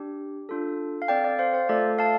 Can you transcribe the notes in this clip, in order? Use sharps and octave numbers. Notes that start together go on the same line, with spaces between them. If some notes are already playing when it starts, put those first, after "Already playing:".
Already playing: D4 G4
D4 F4 A4
F5
C4 A4 D5 G5
D5
C5 F5
C5 F5
A3 F4 A4 D5
F5 A5